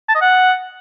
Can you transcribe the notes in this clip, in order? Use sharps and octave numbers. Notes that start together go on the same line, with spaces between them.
A5
D#5
F#5